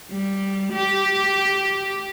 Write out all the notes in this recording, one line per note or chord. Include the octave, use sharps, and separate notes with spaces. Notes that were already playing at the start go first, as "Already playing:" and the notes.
G3
G4